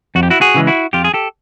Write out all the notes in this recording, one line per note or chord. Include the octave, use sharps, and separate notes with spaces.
F2 F#4
G4
E4 F#4
F#4 G#4
C#3 E3 G#3
E4 F#4
F2 F4 G4
G#4
G4 A4